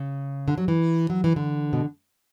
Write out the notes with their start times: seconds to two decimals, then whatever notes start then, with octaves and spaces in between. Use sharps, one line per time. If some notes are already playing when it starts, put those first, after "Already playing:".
Already playing: C#3
0.48 D3
0.58 F#3
0.68 E3
1.10 F#3
1.24 E3
1.36 D3
1.73 B2